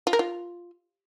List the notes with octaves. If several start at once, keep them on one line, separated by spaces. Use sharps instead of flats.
F4
A#4
F4